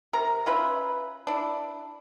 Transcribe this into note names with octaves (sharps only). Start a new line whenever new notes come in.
C3 A#4 A#5
C#4 F4 B4 E5
D4 E4